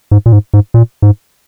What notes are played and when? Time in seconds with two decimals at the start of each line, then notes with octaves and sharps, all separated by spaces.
0.11 G#2
0.26 A#2
0.32 G#2
0.54 G#2
0.74 A#2
1.02 G#2